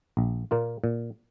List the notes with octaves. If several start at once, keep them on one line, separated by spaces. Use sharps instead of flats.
A#1
A#2 A#3 F4
A#2